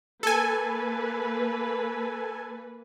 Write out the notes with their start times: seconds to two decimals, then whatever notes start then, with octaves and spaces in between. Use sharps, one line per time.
0.23 A#3 A4 B4 G#5